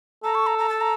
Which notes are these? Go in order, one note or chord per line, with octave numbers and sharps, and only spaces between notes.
A4 A#5
C#6
A#5
A#5
A5
A#5